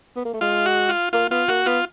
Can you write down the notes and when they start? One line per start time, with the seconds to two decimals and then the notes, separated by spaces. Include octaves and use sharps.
0.16 B3
0.25 A#3
0.34 A3
0.41 G#3 F4
0.66 F#4
0.89 F4
1.13 A#3 F4
1.31 B3 F4
1.48 A#3 F#4
1.66 B3 F4